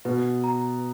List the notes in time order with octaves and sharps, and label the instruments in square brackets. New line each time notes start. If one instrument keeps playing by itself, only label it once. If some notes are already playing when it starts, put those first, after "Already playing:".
[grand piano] B2 [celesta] B4
[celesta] A#5